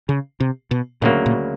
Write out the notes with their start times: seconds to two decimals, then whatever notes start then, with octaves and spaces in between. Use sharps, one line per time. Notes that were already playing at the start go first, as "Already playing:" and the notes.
0.09 C#3
0.40 C3
0.71 B2
1.02 D2 A#2 C#3 F#3 A#3
1.26 A#2